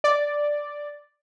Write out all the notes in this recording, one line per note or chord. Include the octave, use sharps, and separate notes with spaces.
D5